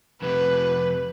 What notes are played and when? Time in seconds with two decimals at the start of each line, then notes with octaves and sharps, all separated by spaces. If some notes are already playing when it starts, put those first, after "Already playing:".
0.22 F2 C3 B4